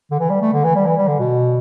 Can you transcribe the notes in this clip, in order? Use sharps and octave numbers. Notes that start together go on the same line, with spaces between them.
D3
E3
G3
A3
D3
E3
G3
E3
G3
D3
B2